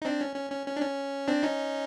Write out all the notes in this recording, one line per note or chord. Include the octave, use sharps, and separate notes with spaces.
D#4
C4 D4
C#4
C#4
C#4
C#4
D4
C#4
C4 D4
C#4 D#4